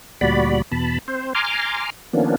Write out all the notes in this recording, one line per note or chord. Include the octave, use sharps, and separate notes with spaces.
D2 A#2 G3 F#4 D5 B5
E2 B2 A5 B5
C4 C5
G#5 A#5 C6 D6 F6
D#3 F3 A#3 B3 C#4 D4